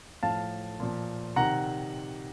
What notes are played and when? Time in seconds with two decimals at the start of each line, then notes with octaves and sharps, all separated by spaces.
0.23 A2 F3 F5 A5
0.80 A#2 F3
1.36 C3 D#3 F#5 A#5